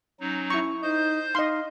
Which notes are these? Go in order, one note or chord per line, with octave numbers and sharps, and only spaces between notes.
F#3 C#4 D#4
E4 C#6
D#4 C5 D#5 G6
D#4 D#5 F5 C6